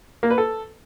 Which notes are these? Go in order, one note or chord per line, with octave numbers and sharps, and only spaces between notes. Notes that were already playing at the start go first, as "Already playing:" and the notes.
A#3
B4
A4